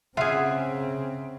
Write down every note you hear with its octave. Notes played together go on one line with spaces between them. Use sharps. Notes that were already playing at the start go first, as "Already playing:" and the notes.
C#3 C4 F4 G#4 E5 F#5